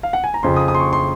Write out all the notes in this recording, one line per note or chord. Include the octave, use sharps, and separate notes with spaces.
F5
F#5
G#5
A#5
F2 C#3 F3 C6
D#6
D#6
C6
C#6
C6